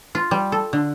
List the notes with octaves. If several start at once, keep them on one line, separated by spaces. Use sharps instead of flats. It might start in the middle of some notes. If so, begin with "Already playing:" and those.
F4
G3
A4
D3